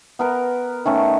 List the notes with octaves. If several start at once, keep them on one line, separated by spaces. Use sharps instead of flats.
B3 A#4 A#5
D#3 A3 C#4